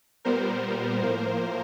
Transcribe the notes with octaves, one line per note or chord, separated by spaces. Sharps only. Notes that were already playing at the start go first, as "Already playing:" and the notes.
A#2 G3 B3 A#4 C5
A2 F3 A#3